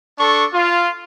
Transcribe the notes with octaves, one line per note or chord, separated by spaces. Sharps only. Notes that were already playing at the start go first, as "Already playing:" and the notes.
D4 A4 C#6
F4